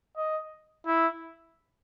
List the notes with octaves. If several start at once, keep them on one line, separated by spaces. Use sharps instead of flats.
D#5
E4